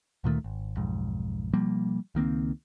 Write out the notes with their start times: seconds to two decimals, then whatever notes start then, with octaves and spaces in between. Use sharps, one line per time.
0.24 D2 A#2 D#3 A3
0.44 G#1
0.77 B1 F2 G#2
1.53 B2 F3 G3 A#3
2.15 C#2 D#3 A#3 C4